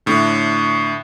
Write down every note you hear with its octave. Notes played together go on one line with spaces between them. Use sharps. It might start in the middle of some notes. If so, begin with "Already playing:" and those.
A2 D3